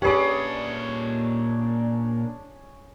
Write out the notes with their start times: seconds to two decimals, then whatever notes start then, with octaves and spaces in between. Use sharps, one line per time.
0.02 A#2 C#4 D4 G4 G#4 B4 D5 F#5